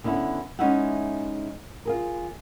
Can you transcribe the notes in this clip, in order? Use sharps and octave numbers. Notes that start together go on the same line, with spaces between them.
D3 B3 C#4 E4
G#3 C#4 D#4 E4 E5 F#5
F4 G#4 A#4